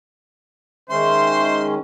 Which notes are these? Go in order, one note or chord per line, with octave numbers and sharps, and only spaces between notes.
D#3 G#3 C#4 C5 E5 C6